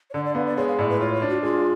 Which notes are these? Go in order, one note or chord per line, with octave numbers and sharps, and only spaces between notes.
C#5
D3 D5
D5
B3 F5
D5
G#3 C#5
F5
A2 D5
B4
F4 C#5
C#5
D4
F#4
G#3 F4